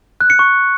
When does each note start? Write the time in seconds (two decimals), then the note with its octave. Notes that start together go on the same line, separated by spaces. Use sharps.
0.21 F#6
0.30 C#7
0.39 C#6